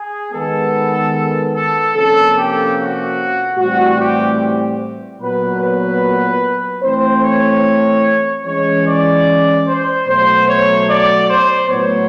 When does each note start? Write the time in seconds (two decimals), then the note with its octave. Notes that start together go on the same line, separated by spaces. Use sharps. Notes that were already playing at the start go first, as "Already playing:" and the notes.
Already playing: G#4
0.32 D#3 G#3 B3 A4
1.54 A4
1.95 C3 F3 A#3 C#4 A4
2.36 G4
2.77 F#4
3.57 A2 E3 G3 C4 F#4
3.97 G4
5.20 A#2 F#3 B3 B4
5.60 B4
6.82 E3 A3 C4 C5
7.22 C#5
8.44 E3 G#3 C#4 C#5
8.85 D5
9.66 C5
10.07 B2 F#3 A3 C5
10.47 C#5
10.87 D5
11.28 C5
11.69 A2 F#3 B3 C#5